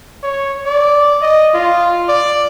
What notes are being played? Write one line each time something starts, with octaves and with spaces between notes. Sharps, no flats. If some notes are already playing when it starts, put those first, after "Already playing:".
C#5
D5
D#5
F4
D5